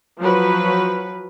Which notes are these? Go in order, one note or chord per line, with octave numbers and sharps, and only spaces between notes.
F3 F#3 B4